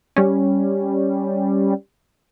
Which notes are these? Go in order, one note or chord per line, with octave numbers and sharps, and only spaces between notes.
G3 C#4